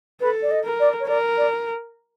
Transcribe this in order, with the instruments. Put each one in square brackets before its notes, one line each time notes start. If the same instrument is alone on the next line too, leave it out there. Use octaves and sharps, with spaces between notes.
[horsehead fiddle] A4 [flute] B4
[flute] D5
D#5
[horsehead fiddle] A#4
[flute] D5
C#5
[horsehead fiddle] A#4 [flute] D5
[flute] D5